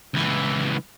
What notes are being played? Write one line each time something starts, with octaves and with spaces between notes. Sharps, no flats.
C#2 E3